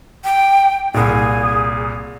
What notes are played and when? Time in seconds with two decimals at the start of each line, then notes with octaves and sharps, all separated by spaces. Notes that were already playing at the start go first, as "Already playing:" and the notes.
0.24 G5
0.94 C2 A#2 G#4